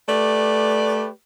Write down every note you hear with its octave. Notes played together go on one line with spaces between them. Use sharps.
A3 G4 B4 D5